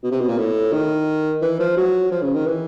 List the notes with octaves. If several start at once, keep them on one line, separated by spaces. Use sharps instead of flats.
B2
C3
B2
A#2
A2
D#3
E3
F3
F#3
F3
C#3
D#3
E3